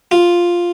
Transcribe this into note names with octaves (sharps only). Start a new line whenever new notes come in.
F4